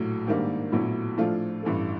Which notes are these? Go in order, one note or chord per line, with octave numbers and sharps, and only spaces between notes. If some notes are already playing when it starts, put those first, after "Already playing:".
Already playing: A#1 A2 F#3
G#2 D#3 G3 A#3 D4
A#1 A2 F#3 B3 E4
A2 F3 A3 D4 F4
A1 G2 E3 A3